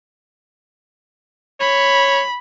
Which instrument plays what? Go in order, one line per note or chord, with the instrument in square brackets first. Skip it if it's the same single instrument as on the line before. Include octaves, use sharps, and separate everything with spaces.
[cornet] C#5 [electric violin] B5